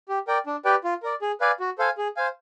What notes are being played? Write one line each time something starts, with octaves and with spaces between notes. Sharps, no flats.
G4
A#4 D5 G5
D4
G4 B4 D5 G5
F4
A#4 D5
G#4
B4 D5 F5 G#5
F#4
A4 C5 F5 G#5
G#4
C5 F5 G#5